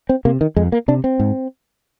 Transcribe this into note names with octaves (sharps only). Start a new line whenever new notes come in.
C4
C3 A#3
D#3
F2 G#3
A#3
C3 D4
C4
G#2